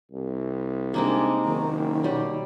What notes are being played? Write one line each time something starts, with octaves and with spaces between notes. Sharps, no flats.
C2
C3 G#3 A#3 D4 D#4
F#1 D#3
B2 F#3 G3 G4